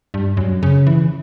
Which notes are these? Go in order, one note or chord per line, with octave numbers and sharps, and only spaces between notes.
G2
F#2
C#3
E3